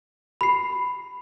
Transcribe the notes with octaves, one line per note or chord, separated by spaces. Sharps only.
B5 C7